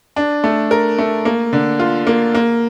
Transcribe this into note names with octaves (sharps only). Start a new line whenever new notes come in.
D4
A3
A#4
A3
A#3
D3
F4
A#3
A#3